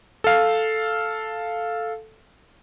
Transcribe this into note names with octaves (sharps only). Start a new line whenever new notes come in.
A4 F5